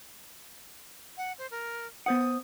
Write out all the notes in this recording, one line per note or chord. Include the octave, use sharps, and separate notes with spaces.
F#5
C5
A#4
B3 C5 F#5 D#6